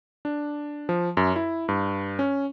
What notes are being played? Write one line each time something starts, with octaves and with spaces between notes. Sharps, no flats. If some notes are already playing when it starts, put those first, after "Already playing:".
D4
F3
F#2
E4
G2
C#4